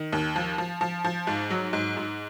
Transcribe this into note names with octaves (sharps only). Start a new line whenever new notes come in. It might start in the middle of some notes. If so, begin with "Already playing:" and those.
Already playing: D#3
D#2
F3
F3
F3
F3
G#2
F#3
G#2
G#2